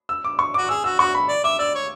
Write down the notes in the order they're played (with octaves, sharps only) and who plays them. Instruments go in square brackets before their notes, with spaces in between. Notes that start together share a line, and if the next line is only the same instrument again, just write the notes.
[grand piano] E6
D6
C#6
[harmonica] F#4 [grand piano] D6
[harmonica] G#4 [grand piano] E6
[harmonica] F#4 [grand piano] E6
[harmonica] F#4 [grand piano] C#6
[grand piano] B5
[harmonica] D5
[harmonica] E5 [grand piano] D6
[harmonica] D5 [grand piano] E6
[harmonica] C#5